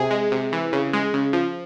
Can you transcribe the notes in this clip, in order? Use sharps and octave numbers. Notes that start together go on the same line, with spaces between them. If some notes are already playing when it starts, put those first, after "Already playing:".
Already playing: C3 G#4
G#3
C3
E3
C#3
G#3
C#3
F3